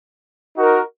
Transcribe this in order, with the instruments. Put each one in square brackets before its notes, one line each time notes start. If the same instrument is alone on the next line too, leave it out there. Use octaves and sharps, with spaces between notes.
[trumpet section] D#4 F#4 A#4